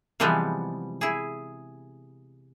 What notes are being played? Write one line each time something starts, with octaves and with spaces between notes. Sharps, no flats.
C3 E3 F3 G3 G#3 B3
E4 G#4